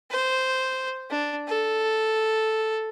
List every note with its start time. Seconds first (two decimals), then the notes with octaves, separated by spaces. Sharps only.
0.11 C5
1.10 D4
1.48 A4